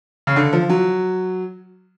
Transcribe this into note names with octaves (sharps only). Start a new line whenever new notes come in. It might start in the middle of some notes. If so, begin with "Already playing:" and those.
C#3
D3
F3
F#3